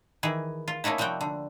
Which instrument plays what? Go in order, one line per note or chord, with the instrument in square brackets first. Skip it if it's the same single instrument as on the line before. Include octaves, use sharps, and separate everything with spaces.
[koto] D#3 E3 G#4
F4
A3 A#3 C#4 D#4 E4
C3 F3 G3 F#4 G5
D3